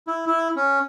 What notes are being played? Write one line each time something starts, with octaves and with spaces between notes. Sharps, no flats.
E4
E4
C#4